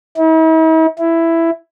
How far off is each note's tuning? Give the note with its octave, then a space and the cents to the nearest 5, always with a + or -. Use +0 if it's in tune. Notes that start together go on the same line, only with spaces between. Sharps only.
E4 -45
E4 +10